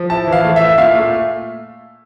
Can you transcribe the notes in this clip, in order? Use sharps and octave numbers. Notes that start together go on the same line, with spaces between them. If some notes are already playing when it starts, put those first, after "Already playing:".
Already playing: F3
E4 A5
E3
F5
A3
E4 E5
A#2 F5
A3